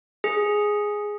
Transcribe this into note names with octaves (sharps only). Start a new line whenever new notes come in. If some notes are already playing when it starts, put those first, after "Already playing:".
G#4